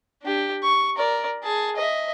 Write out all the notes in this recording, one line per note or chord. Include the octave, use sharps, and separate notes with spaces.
D4 G4
C#6
A#4 D5
G#4 A5
D#5 E5